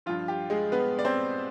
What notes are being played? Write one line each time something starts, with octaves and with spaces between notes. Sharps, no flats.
G2 F3 F4
G4
G#3 G#4
B3 B4
D5
C4 C5